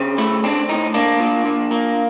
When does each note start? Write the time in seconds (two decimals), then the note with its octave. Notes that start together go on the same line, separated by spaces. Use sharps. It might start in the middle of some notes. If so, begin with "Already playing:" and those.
Already playing: C#3 C4
0.18 A3 E4
0.44 C4 D4
0.69 A2 D#4
0.94 A#3 D4
1.20 A#2
1.45 A#2
1.71 A#3